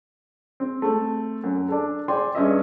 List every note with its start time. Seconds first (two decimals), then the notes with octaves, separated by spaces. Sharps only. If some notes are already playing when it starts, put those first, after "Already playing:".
0.60 C4
0.82 A3 C4
1.44 F#2
1.69 D4 A4
2.08 D5 G5 G#5 C6
2.35 G2 C#4 G#4 D#5 E5